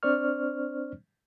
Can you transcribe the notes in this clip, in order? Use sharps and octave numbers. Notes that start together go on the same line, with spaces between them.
C4 D4 C5 D5 C#6 F6